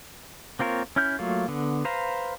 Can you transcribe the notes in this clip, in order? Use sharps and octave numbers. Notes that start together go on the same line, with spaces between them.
A#3 C4 F4 A#4 C#5
C#4 E4 F6 G6
F#3 A3 A#3 F4
D3 B3
B4 C5 F5 A#5